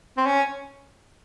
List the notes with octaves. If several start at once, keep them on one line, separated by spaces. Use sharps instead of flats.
C4
C#4